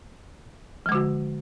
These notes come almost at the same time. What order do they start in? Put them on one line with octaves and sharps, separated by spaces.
F3 G#3 D3 F#4